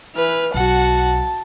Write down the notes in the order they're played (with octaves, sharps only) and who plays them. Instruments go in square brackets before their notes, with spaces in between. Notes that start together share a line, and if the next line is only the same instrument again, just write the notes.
[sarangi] E3 [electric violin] B4 F6
[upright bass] B1 [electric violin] F#4 F#5 [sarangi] A5